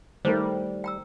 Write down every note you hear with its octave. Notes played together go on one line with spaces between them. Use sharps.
D#3 G3 A3 A#4 C5
G5 A#5 E6